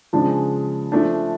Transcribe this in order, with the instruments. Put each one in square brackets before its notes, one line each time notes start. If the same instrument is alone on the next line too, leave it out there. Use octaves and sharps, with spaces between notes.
[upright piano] C#3 F3 G#3 D4
F3 A3 D4